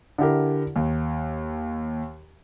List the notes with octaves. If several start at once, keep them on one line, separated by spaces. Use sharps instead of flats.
D3 E4 G4 A#4
D#2